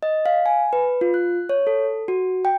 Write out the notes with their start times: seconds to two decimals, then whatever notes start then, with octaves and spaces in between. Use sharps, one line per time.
0.03 D#5
0.26 F5
0.46 G#5
0.73 B4
1.01 F4
1.14 F#6
1.49 C#5
1.67 A4
2.08 F#4
2.45 G5